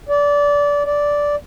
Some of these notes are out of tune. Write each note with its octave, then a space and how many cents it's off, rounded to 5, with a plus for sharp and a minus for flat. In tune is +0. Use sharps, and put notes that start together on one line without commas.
D5 -20
D5 -5